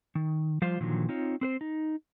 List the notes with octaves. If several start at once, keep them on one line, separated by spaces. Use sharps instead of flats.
D#3
F3 G3 F4 C5 F5
A#2 D3 D#3 F3 F#3
C4 D#4 F4 C#5
C4 B4 C5
D#4